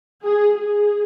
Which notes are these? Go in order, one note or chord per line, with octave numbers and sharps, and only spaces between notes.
G#4
G#4